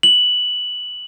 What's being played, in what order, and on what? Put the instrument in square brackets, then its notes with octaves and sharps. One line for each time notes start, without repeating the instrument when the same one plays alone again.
[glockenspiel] F#7